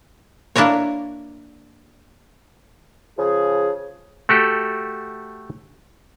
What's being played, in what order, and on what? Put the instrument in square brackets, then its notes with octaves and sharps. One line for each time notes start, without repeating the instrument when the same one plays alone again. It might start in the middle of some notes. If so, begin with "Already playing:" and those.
[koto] A#3 D4 E4 A#4 C#5
[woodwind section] C#3 F3 G#4
[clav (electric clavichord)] A3 F#4 G4 A4